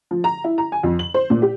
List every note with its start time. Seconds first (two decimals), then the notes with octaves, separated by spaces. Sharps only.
0.11 F3
0.24 A#5
0.44 E4
0.58 A#5
0.72 G#5
0.83 F2
0.99 F#7
1.14 C5
1.30 A#2
1.42 G4